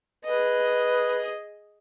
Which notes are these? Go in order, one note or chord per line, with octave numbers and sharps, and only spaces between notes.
G#4 B4 D#5